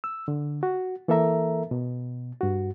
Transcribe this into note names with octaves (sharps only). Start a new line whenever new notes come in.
E6
D3
F#4
E3 A#3 A4 A#4 E5 A#5
B2
G2 F#4